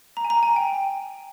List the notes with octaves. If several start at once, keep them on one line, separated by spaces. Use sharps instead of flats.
A#5
G#5
A#5
G#5
G5